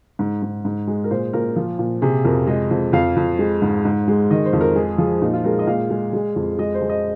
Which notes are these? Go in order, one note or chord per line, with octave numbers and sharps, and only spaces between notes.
G#2
G#2
G#2
G#3
A#4
A#2 C5
A#2 A#4
F3
A#2
C3 G#4
F2 A#4
G#3 D#5
F2
F2 F5
F2
G#3
G#2
G#2
G#3
D#3 D#5
C5
F2
A#4
G#3 G#4
F3 G#4
A#2 D#4
F4
G#3 A#4
D#5
A#2 F5
G#3
G#3
F2
G#3 D#5
C5
G#3
D#5